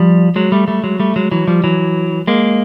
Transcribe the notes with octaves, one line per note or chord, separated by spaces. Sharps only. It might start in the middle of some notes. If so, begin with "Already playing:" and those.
Already playing: F3 G3
F#3 G#3
G3 A3
G3 A3
F#3 G#3
G3 A3
F#3 G#3
E3 F#3
F3 G3
E3 F#3
G#3 A#3